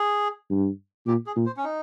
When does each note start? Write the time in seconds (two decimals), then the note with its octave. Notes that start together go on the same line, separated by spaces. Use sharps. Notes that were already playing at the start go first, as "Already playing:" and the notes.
Already playing: G#4
0.51 G2
1.07 A#2 G4
1.26 G#4
1.36 A#2
1.46 C5
1.57 C#4
1.64 D#4